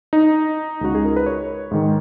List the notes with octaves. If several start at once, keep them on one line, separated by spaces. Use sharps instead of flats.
D#4
C#2 C#3 G#3 F#4
G#4
A#4
B4
C#5
G#2 D#3 G#3